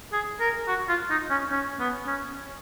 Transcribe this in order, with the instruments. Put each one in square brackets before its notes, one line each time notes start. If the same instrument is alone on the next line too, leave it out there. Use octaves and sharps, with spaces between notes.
[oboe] G#4
A#4
F#4
F4
D#4
C#4
C#4
B3
C#4